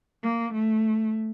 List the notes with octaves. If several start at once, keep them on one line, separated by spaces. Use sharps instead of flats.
A#3
A3